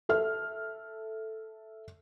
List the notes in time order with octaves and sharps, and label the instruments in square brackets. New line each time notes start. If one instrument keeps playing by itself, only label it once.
[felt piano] A4 E5 F6